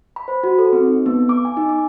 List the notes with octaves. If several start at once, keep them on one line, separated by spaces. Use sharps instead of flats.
B5
C5
F#4
A4
C4
D#4
B3
D6
G#5
D#4
D6